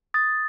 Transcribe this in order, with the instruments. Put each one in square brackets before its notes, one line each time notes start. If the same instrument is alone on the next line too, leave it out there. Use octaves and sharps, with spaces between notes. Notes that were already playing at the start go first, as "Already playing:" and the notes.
[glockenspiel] D#6 A6